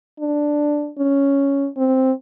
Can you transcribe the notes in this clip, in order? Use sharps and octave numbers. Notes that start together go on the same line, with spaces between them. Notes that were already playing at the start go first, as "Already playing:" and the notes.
D4
C#4
C4